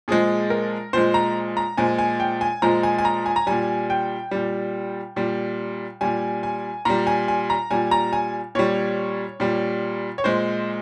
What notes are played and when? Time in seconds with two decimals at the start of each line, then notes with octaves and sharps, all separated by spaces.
0.08 A#2 F3 G#3 G#4
0.50 A#4
0.93 A#2 F3 G#3 C5
1.14 A#5
1.57 A#5
1.77 A#2 F3 G#3 G#5
1.98 G#5
2.20 G5
2.41 G#5
2.62 A#2 F3 G#3 A#5
2.83 G#5
2.98 G#5
3.05 A#5
3.26 G#5
3.36 A#5
3.47 A#2 G3 G#5
3.90 G5
4.31 A#2 G3
5.16 A#2 G3
6.01 A#2 G3 G#5
6.43 G#5
6.85 A#2 G3 A#5
7.07 G#5
7.28 G#5
7.50 A#5
7.71 A#2 G3 G#5
7.91 A#5
8.13 G#5
8.55 A#2 G3 C#5
9.40 A#2 G3
10.18 C#5
10.24 A#2 G#3 C5